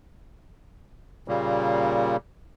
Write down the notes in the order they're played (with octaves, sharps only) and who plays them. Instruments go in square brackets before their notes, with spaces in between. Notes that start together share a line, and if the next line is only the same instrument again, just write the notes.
[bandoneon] A#2 C#3 G3 A#3